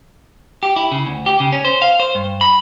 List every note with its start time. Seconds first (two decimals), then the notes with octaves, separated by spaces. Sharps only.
0.63 G4
0.76 E4
0.92 C#3
1.06 D2
1.26 G4
1.40 C#3
1.52 C#4
1.65 C5
1.82 F5
2.00 C5
2.15 G2
2.41 B5